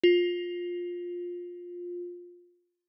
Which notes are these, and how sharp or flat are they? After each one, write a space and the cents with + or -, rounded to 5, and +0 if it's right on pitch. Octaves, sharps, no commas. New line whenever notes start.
F4 +15